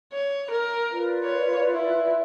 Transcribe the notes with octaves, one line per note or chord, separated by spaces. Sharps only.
C#5
A#4
F4 B4 D5
C#5
E4